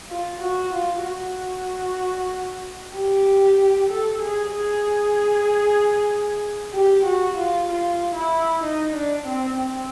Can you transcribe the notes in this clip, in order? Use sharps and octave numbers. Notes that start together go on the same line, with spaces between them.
F4
F#4
F4
F#4
G4
A4
G#4
G#4
G4
F#4
F4
F4
E4
D#4
D4
C4
C4